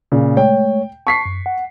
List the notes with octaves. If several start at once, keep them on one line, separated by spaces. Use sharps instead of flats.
A#2 C#3
G#3 A3 C#5 G5
A5 C#6 B6 C7
F#2
F#5